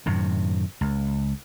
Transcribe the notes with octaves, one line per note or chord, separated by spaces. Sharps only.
F#2 A2 C3 D#3
C#2